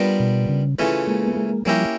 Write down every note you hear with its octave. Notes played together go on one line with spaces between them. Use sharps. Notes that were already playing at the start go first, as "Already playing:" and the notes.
Already playing: G3 B3 D4 F4 A#4
B2
C#3
C#3 E3 A3 C#4 F4
G#3 A#3
B3
G#3 A#3
F3 G3 A#3 C#4 E4 G4 A#4